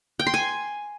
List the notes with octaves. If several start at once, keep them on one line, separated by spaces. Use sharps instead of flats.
G5
C6
G#5